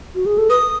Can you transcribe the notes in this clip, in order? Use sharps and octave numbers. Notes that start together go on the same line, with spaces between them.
F#4
G#4
A4
B4 D#6